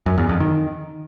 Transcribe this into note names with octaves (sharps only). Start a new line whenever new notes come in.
F#2
E2
F2
D#3